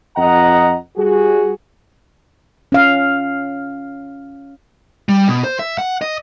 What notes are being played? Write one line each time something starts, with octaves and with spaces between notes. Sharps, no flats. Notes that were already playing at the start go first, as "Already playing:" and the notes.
F2 D#5 F#5 A#5
G3 F#4 G#4
C#4 F5
G3
B2
C5
E5
F#5
D#5